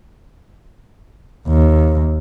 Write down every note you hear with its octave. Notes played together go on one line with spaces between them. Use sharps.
D#2